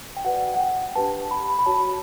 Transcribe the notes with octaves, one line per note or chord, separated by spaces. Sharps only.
G5
F#4 B4 D5 F#5
F#5
G5
D4 G4 B4 A5
B5
B5
F#4 C#5 A5